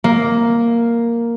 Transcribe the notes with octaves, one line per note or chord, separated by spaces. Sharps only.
A#3